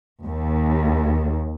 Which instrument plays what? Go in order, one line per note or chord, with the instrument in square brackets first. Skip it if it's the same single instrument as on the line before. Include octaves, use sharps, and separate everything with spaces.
[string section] D#2